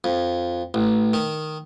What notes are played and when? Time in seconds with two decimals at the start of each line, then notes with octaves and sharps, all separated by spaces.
0.04 F2
0.74 A1
1.13 D#3